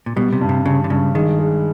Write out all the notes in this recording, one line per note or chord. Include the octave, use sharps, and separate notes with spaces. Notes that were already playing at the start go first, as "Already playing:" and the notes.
A#2
B2 G3
C3
G2
C3
G2 C#3
D3
G2 C#3
D#3 G#3
G#3